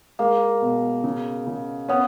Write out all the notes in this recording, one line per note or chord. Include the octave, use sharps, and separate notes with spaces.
G#3 A#3
B2
C#3
C#3
B3 C#4